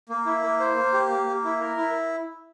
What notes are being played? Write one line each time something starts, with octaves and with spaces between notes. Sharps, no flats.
A#3
E4
A#3
C5
A#3
G4
A#3
A#3
E4
A#4
E4